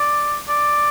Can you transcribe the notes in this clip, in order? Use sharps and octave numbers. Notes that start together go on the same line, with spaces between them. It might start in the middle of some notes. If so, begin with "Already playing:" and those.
Already playing: D5
D5